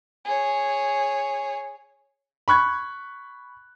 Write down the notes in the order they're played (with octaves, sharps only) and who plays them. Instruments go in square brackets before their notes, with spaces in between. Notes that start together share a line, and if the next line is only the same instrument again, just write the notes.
[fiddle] G#4 C#5
[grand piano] B5 C#6 F#6 G#6